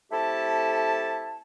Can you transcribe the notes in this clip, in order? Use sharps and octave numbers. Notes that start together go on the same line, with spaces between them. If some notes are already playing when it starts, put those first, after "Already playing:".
A3 C4 E4 G4 A4 A5